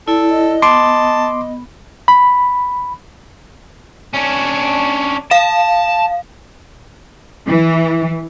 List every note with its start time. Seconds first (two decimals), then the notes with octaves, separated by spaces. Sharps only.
0.08 E4 A4 D5
0.30 D#5
0.62 B3 A5 C6 D6
2.08 B5
4.14 C#4 D4
5.31 F5 A5
7.48 E3